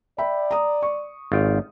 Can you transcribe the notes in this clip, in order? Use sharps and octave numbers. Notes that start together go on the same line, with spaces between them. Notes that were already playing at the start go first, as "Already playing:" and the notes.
D5 E5 G5 B5
A#5 D#6
C#6
G#1 F4 G5